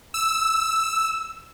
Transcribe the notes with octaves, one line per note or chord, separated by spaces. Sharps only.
E6